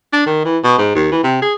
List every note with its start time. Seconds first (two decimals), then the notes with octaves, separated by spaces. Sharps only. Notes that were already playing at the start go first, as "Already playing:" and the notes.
0.13 D4
0.26 D#3
0.45 E3
0.64 B2
0.78 G#2
0.95 D#2
1.12 E3
1.24 C3
1.42 G#4